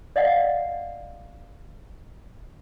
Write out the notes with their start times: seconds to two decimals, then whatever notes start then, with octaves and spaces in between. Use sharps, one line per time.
0.16 D5 D#5 F5 F#5